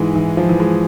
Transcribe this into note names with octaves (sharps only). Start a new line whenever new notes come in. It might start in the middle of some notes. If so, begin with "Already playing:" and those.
Already playing: G#2 E3 G#3
E3
F3
E3
G#3